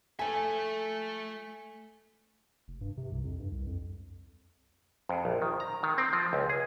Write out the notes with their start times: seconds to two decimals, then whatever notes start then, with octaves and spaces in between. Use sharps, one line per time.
0.19 F3 A3 A4 E5 G#5
2.68 F1
2.81 G2
2.97 C3
3.12 C2
3.25 F2
3.40 G2
3.52 C2
3.67 F2
5.09 F2
5.25 A#1
5.42 D#3
5.60 A#5
5.83 D#3
5.98 C4
6.13 F3
6.33 C#2
6.49 G#4